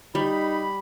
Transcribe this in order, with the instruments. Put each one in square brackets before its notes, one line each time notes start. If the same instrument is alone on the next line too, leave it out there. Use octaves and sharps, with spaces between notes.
[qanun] G3 [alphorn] D#4 [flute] B5